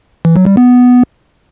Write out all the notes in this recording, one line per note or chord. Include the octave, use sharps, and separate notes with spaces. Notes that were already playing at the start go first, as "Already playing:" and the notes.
E3
F#3
G3
B3